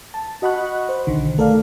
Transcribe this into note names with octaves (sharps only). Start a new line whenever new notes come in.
A5
F#4 D#5 F#5 B5 C#6 F#6
C5
B1 D3 D#3
A3 A4 A#4 D5 F5